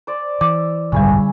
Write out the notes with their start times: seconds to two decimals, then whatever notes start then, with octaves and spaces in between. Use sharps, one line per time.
0.07 C5 D5
0.41 E3 D6 E6
0.92 F#1 B1 G#2 D3 G3 C#4 E4 G#4